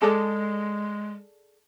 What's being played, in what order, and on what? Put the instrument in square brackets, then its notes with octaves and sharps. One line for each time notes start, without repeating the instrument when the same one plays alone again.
[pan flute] G#3 [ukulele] G#4 A4 D5